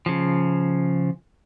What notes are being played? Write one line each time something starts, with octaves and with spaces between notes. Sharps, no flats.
C#3 F3